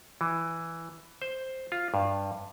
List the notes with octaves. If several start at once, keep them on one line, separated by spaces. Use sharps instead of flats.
E3
C5
F4
G2